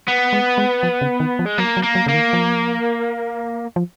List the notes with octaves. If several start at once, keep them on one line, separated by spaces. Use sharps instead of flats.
B3
G#3
G#3
F3
C#3
D#3
F3
G#3
F#3 A#3
F#3
A#3
F#3
C#3 A#3
D#3
F3
F3